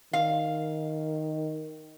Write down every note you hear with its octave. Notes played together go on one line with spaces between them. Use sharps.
D#3 F5